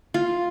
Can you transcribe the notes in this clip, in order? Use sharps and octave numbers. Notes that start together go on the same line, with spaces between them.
F4